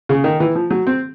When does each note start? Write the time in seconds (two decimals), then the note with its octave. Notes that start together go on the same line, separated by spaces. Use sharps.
0.09 C#3
0.24 D#3
0.40 E3
0.55 F3
0.70 F#3
0.87 C4